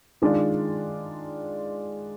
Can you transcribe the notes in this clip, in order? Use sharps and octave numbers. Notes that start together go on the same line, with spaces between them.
D#3 G#3 D4 F4